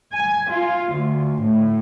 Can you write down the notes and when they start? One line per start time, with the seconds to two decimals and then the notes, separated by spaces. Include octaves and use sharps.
0.14 G#5
0.50 F4
0.92 D2
1.43 A2